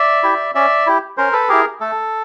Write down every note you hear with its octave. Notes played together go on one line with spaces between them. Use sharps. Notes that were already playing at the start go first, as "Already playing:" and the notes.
Already playing: D5 E5
E4 G4
C#4 D5 E5
E4 G4
C#4 A#4 C5
A4 B4
E4 G4 G#4 A#4
A3 A4